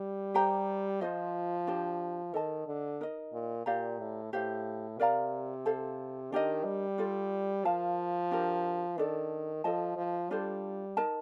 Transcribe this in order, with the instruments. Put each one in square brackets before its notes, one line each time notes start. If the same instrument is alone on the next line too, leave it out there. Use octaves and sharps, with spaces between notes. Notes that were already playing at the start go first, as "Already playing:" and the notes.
Already playing: [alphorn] G3
[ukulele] G4 C5 G5 A#5
[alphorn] F3 [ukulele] F4 C5 D#5
[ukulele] D4 G4 C5
[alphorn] D#3 [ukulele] A4 D#5 A5
[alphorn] D3
[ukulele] D#4 A#4 D#5
[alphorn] A#2
[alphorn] A#2 [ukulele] G4 D5 F5 A#5
[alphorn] A2
[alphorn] A2 [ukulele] G4 C5 F5
[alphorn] C3 [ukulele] A#4 D5 F5 A#5
[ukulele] A4 C5 F5
[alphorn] D#3 [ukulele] D4 G4 A#4 D#5
[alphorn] G3
[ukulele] F4 A4 D5
[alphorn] F3 [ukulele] A#4 F5 A5
[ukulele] D4 G4 A#4
[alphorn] D#3 [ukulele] D4 A4 D5
[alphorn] F3 [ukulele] A4 D#5 A5
[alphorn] F3
[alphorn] G3 [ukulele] D4 F4 A4 C5
[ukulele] D#4 A#4 D#5 A5